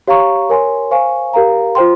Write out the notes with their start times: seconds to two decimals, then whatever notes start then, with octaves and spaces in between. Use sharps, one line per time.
0.08 G4 C#5 F5 A#5 C#6
0.49 A#4 C#5 G#5 C6
0.91 C5 F5 G#5 C#6
1.33 G4 A#4 F5 A#5
1.75 F4 C5 G5 C6